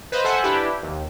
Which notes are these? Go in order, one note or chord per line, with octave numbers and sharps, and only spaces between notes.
B4 C5 D#5 F5
A4 C5 E5 F#5 G#5
D4 E4 G4 B4
D#2